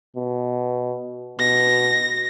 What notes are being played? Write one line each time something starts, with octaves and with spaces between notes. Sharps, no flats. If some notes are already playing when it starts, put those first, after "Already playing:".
B2
B2 A#6